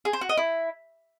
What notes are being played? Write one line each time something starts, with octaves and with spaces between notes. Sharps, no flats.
G#4
C5
F#4
D#5
E4